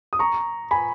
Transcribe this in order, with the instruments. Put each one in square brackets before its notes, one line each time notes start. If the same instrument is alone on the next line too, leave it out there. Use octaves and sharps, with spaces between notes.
[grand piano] D#6
A#5 C#6
G#5 B5